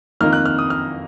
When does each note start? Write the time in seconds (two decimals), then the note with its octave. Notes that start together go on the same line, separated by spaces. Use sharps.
0.20 F2 D#3 A#3 D#4 F6
0.33 F#6
0.46 F6
0.59 D#6
0.70 F6